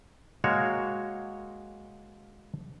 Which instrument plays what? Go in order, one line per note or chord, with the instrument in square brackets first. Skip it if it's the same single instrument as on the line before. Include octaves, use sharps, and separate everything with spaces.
[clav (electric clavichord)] G#3 A#3 F#4 C#5